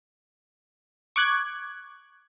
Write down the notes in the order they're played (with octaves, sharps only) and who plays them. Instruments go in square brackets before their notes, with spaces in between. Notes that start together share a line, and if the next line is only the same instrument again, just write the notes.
[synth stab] C#6 D6 F#6 G#6